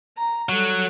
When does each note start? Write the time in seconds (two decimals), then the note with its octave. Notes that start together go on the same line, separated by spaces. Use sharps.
0.17 A#5
0.49 F#3 G3 A4 F#6